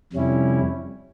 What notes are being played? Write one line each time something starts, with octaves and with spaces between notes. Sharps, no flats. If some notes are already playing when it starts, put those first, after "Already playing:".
F2 C3 G3 C#4 E4